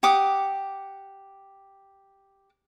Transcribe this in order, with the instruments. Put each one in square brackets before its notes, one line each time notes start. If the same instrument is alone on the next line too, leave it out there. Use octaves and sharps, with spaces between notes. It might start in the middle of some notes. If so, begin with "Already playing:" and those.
[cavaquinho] G4 F#5 D6 D#6